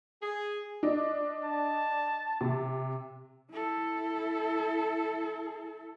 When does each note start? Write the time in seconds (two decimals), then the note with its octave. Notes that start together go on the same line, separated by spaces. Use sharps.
0.22 G#4
0.83 D4 D#5
1.44 A5
2.41 C3
3.51 E4 A4